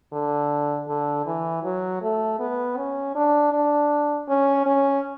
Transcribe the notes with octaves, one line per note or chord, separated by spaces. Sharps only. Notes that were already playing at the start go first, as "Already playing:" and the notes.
D3
D3
E3
F#3
A3
B3
C#4
D4
D4
C#4
C#4